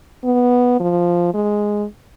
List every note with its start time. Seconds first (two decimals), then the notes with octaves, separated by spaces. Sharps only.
0.24 B3
0.79 F3
1.34 G#3